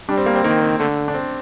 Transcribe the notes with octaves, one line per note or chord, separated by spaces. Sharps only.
G3 D4
C4
A#3
C4
D#3 A#3
C4
D3 A3
D4
C4